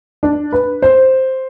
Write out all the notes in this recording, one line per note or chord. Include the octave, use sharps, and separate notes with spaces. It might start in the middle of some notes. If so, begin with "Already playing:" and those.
D4
B4
C5